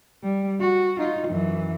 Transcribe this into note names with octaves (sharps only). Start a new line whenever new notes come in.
G3
F#4
D#4 F4
F#2 E3